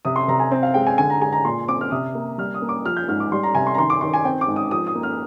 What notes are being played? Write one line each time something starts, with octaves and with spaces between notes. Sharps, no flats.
C3 D#6
C6
C3 A#5
G#5
C4
F5
G#3 G5
G#5
D3 G#5
A#5
G#3 G#5
A#5
A#2 C6
C4 D6
F6
C3 D#6
A#3
G3 F6
D#6
A#3
D6
F3 F6
G6
G#2 F6
D6
G3 C6
A#5
C3 G#5
C6
A#5
D#3 C6
D6
D#3 C6
G#5
C4 G5
D6
G#2
D#6
F3 D#6
D#6
A#3
F6